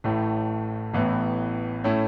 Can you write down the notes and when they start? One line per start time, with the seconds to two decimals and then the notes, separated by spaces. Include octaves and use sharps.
0.04 A1 A2 A3
0.94 A1 A2 E3 B3
1.84 A2 A3 C#4 E4